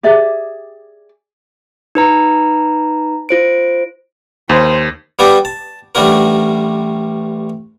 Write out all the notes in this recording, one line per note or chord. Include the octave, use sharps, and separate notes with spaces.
G4 G#4 D5 E5
D#4 B4 A#5
F4 C5 D7
D#2 C5
G3 B3 F#4 G4 D5
A5
A1 G3 A3 D4 F#4 A#4